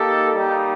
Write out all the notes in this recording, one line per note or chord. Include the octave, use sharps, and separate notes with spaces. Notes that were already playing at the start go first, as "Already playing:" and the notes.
Already playing: A#3 D#4 G4 A4
G3 A#3 D#4 G4